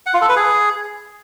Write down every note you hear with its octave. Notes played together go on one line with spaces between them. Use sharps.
F#5
F4
A4
B4
G#4